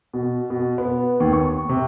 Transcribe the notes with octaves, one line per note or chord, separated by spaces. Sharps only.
B2
B2
B3
D#2
C#6
C3